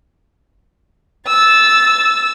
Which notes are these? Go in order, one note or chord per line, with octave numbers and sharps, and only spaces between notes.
E6 A6